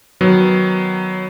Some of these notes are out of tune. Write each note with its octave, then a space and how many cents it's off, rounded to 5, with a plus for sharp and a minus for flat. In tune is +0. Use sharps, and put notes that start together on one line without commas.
D#3 +0 F#3 +0 B3 +0